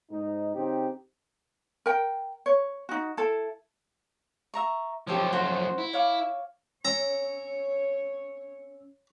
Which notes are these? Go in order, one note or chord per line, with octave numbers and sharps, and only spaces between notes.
G#2 D#4
C#3 C4 D#4 G4
A#4 G5
C#5
D#4 F#4
E4 A4
E5 A#5 C#6
F#2 F3 G4 A4 C#5
F#4 C5
E4
C#5 F5 D6
C#4 C#5 A#5 E6